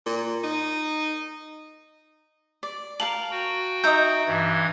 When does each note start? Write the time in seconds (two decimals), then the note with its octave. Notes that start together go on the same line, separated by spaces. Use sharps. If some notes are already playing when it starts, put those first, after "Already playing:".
0.06 A#2
0.43 D#4
2.63 D5
3.00 A#4 F5 A5 F#7
3.31 F#4 G5
3.84 D#4 E5 A#5 D#6 G6
4.27 G2 E3 G#6